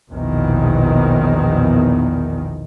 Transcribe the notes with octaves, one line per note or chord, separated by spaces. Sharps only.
A#1 E2 B2 D#3